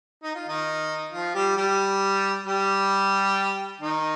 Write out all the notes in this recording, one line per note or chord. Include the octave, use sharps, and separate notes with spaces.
D#4
F4
D#3 D#4
F3 F4
G3 G4
G3 G4
G3 G4
D#3 D#4